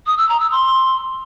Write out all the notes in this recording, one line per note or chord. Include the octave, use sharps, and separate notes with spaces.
D#6
E6
A#5
E6
C6